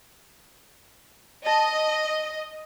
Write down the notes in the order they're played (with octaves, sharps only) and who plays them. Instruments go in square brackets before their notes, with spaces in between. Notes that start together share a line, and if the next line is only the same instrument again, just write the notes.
[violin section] D#5 [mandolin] A5